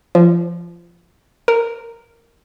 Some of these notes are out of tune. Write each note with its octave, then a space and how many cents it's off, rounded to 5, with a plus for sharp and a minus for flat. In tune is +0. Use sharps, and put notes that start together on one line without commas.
F3 -20
A#4 -10